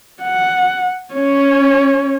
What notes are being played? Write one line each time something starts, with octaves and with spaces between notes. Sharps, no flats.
F#5
C#4 C#5